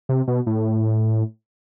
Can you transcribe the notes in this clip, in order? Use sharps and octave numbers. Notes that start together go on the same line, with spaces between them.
C3
B2
A2